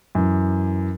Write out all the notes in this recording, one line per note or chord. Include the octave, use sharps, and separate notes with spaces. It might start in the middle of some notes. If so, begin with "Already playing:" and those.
F#2 E3